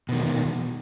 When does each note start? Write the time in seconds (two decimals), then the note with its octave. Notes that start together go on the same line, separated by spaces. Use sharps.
0.09 B2
0.12 D#3
0.15 E2